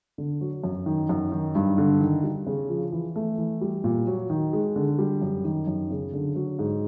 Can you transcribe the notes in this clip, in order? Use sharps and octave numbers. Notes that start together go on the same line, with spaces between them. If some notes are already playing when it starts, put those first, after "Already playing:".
D3
F#3
F#2
D#3
F#2
D#3
G2
D3
D#3
G3
C#3
F3
E3
A3
E3
G3
A#2
F#3
D#3
G#3
D3
G3
F#2
D#3
F#2
C#3
D3
F#3
G#2